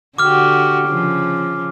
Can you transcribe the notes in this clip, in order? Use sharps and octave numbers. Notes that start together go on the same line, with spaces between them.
D3 F#4 G4 D6 F6
C#3 F3